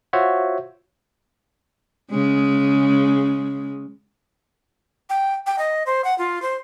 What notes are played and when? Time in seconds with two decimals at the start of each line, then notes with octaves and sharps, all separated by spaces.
0.13 F4 F#4 C5 C#5 E5 F#5
2.10 C#3 G#3
5.09 G5
5.46 G5
5.58 D#5
5.86 C5
6.04 F#5
6.18 F4
6.42 C5